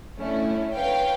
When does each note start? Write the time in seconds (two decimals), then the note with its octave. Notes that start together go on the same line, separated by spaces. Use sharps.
0.18 A3 C#4 D4 E4
0.73 B4 C#5 F5 G5